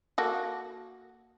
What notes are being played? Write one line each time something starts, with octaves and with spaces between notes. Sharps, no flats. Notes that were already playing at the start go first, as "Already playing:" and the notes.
A#3 F#4 A4